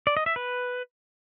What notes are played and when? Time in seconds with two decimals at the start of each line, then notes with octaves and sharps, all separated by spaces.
0.07 D5
0.17 D#5
0.26 E5
0.36 B4